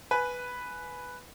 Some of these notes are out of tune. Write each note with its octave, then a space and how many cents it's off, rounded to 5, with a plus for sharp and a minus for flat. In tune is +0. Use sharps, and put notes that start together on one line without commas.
B4 +0 G#5 +15